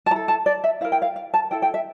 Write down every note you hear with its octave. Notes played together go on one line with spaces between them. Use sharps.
A5
E4 A#5
A4
A5
D5
E5
E4 A#4 F5
G5
F5
F5
A5
E4 A4 G5
G5
E5